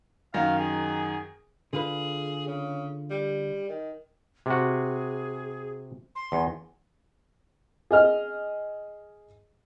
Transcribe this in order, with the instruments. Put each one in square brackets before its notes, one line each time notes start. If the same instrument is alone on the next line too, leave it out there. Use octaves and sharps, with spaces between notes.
[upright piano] F#2 D#3 A#6 [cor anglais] F5
[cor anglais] G#4
[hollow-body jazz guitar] D3 F4 B4 [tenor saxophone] G#4
[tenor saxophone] C#3
G3
D#3
[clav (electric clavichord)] C3 F#4 [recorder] G#4
[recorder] C6
[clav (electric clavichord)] E2
[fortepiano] G#4 D#5 F6